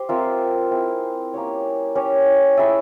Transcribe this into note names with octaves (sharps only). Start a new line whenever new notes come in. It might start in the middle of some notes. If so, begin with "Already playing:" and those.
Already playing: G4 C5
C4 F4 A#4 E5
C4 E4 G#4
A#3 C#4 G4 C#5
C#4 G4 C#5
E4 G#4 E5